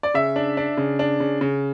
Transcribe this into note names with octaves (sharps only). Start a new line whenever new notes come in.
D5
C#3 E5
D4
D4
C#3
D4
C#3
C#3